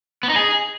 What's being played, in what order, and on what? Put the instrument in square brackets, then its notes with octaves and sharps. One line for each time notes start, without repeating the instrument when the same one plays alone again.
[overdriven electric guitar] B3
D#4
G#4